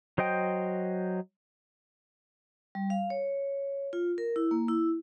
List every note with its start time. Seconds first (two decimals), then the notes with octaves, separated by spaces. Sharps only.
0.18 F#3 C5 D#5 G5
2.75 G3
2.90 F5
3.10 C#5
3.93 F4
4.18 A#4
4.36 E4
4.51 A#3
4.68 E4